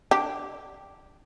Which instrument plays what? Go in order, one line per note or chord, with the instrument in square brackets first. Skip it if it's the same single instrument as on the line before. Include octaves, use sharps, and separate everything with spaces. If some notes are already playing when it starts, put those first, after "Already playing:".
[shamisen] D4 G4